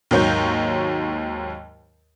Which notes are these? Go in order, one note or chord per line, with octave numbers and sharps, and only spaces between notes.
D#2 G#2 F#3 C#5 G6